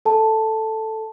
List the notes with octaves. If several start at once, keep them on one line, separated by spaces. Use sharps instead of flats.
A4 A5